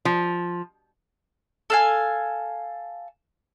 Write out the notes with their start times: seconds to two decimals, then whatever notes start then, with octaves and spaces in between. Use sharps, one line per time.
0.05 F3
1.70 A4 F5 G#5